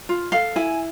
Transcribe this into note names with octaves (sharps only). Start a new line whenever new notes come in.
F4
A4 F5
E4 G#5